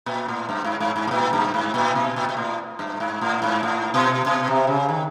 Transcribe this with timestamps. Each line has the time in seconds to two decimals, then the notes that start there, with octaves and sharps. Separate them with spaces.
0.06 A#2
0.28 A2
0.49 G2
0.64 G#2
0.80 G#2
0.96 G#2
1.07 A2
1.11 A#2
1.33 G2
1.54 G#2
1.74 A#2
1.95 B2
2.16 A#2
2.29 A#2
2.37 A2
2.79 G2
3.00 G#2
3.21 A2
3.42 G#2
3.63 A2
3.94 B2
4.26 B2
4.47 C3
4.67 C#3
4.89 D#3